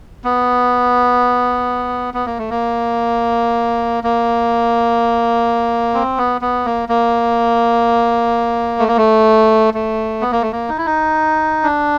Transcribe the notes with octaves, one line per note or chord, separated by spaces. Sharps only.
B3
B3
A#3
A3
A#3
A#3
C4
B3
B3
A#3
A#3
A3
A#3
A3
A3
B3
A#3
A3
A#3
D#4
E4
D#4
D4